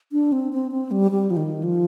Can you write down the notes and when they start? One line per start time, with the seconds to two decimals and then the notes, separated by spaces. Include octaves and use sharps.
0.12 D4
0.32 C4
0.53 C4
0.71 C4
0.91 G3
1.11 G3
1.30 F3
1.37 D#3
1.63 F3